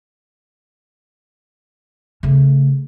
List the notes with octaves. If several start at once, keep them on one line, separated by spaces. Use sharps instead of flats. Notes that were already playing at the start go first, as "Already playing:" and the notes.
C#3 A3